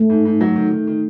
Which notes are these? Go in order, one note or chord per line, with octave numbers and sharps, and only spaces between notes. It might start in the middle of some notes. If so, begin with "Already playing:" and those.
Already playing: A3
G#2
G#2
F#3
D#3
D#3
D#3